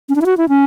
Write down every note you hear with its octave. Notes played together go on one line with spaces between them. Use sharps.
C#4
D4
E4
F#4
E4
C#4